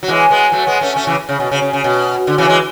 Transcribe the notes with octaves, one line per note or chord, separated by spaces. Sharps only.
F#3
E3 G#3
G#3 B3
F#3 A3
G#3 B3
A3 C#4
A3 C#4
C#3 E3
C#3
B2
C#3
C#3
C#3
B2
D3
C#3 E3
E3 G#3